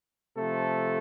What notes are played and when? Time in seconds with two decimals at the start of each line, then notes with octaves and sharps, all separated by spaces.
0.37 C3 F3 A3 A4